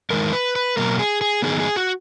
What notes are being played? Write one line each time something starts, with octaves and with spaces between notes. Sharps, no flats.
E2 D#3 G#3 D#4 A#4
B4
B4
B2 F#3 A#3 A#4
G#4
G#4
D#3 F#3 B3 D#4 G#4
G#4
F#4